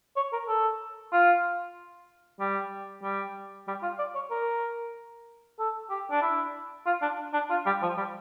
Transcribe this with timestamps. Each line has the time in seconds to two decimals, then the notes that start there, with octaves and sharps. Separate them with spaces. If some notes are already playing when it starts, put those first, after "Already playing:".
0.16 C#5
0.32 A#4
0.48 A4
1.13 F4
2.40 G3
3.03 G3
3.68 G3
3.83 F4
3.98 D5
4.15 C#5
4.31 A#4
5.59 A4
5.90 G4
6.11 D4
6.22 E4
6.86 F4
7.02 D4
7.33 D4
7.50 F4
7.66 G3
7.82 F3
7.97 G3